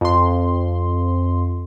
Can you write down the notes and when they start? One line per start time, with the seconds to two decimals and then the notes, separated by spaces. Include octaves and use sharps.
0.01 F2 C6